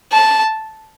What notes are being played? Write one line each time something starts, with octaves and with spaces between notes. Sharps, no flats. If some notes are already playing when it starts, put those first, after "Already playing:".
A5